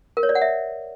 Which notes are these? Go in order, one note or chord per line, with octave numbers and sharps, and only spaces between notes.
A#4
C#5
D5
F#5
E5